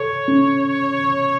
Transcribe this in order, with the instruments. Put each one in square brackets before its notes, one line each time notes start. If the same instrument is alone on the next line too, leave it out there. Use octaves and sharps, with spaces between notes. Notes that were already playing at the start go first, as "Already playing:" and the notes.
Already playing: [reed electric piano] A4 [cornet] C#5
[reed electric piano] C#4